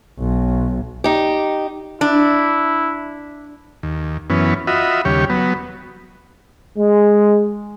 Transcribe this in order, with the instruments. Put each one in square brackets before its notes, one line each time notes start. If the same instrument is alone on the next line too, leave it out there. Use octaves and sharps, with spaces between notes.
[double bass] B1
[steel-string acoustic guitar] D#4 G4
[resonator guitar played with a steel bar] D4 [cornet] E4
[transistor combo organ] D#2
F#2 E3 B3 C#4
F4 F#4 D#5 E5 B5
D#2 C#3 G3 G4 C#5
F#3 B3
[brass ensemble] G#3